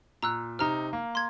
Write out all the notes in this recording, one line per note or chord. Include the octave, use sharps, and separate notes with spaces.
A#2 A#5 E6 F#6
C3 D#4 A#5 F6
A#3
C6 G#6